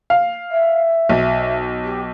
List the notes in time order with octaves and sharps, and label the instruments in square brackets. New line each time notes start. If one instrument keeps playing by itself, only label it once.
[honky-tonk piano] F5
[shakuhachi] E5
[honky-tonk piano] B1
[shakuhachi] G4